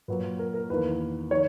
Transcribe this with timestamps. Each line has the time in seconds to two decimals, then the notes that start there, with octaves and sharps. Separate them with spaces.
0.08 A#2 F#3 A#3 B4
0.39 A#4
0.54 A#4
0.70 E2 D#3 A#3 B4
1.31 D#3 C#5